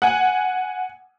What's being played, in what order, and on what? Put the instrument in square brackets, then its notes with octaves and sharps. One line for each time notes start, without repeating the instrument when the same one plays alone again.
[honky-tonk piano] F#5 G#5